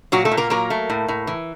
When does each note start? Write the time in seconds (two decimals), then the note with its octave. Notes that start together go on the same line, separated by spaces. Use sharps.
0.12 A#2 F#3 F#4
0.25 A3 A4
0.32 A#2
0.37 A#3 A#4
0.50 F#3 A#3 A#4
0.70 A3
0.90 A2
1.08 A2
1.27 E3